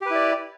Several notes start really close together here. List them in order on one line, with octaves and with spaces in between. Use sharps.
G4 B4 E4 D5